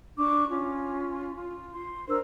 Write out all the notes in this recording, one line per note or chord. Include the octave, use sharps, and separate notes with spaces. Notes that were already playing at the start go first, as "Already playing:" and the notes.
D4 C#6 D6
C#4 F4
F4
C6
D4 A#4 C5 E6